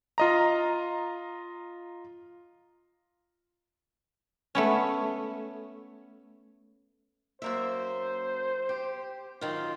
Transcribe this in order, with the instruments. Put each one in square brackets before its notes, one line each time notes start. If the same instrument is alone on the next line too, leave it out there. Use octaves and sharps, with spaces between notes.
[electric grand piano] F4 D#5 A#5
[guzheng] A3 B3 C#4
[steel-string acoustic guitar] F#2 A#3 E5 [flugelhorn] C5
[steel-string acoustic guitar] G4
F#2 D#3 F4